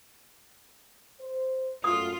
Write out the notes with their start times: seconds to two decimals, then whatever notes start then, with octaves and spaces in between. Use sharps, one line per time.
1.20 C5
1.84 F#2 A3 F4 D#6